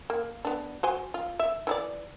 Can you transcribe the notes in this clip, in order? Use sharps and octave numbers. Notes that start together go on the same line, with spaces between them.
A#3
B3 D4
F#4 C5 G#5
F4
E5
E3 E4 D5